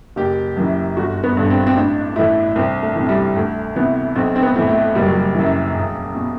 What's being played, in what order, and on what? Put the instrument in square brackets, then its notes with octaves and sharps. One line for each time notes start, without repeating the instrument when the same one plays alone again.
[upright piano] F#1 G4
F#2 E3
G1 F#4
B3
G2 D3 D4
C4
C4
A1 D4
A2 E3 E4
C2 C4
A3
C3 E3
G3
D2 A3
C3 E3 B3
B1 C4
C4
B3
A2 E3
A3
F#1 G3
F#3
G3
F#2 E3
E1
B2